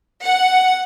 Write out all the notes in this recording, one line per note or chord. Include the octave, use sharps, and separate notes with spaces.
F#5